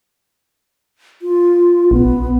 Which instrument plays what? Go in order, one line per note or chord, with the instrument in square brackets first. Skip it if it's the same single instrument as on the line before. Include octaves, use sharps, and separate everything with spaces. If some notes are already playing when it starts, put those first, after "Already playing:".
[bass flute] F4
[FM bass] A#1 [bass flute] B3